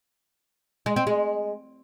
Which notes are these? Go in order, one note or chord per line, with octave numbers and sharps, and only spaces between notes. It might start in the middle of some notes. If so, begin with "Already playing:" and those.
G#3
C4
G#3